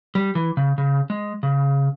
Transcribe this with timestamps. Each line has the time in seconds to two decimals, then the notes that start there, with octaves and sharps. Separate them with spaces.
0.15 G3
0.35 E3
0.57 C#3
0.78 C#3
1.10 G#3
1.43 C#3